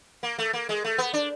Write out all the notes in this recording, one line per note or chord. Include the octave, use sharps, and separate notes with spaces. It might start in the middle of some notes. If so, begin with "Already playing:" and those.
A#3
A3
A#3
G#3
A3
B3
D4